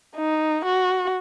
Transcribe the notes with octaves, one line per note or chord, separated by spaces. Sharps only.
D#4
F#4